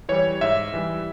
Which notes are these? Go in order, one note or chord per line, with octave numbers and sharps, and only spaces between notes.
E3 G3 C#5
G#2 E5
E3 G3